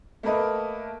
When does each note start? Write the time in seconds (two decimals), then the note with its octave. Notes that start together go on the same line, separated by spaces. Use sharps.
0.23 A3 A#3 A#4 B4 D#5